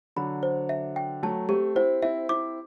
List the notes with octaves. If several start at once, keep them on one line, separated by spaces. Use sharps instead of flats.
D3 F#3 B5
C5
E5
G5
F#3 A3 A5
A3 C4 G4
C4 E4 C5
C4 E4 E5
C4 E4 D6